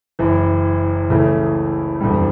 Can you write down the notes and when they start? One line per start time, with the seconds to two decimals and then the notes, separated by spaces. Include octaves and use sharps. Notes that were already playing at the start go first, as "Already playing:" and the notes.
0.19 F#1 F#2 E3
1.10 C#2 C#3 E3 A3
2.00 F#1 E2 D3 G3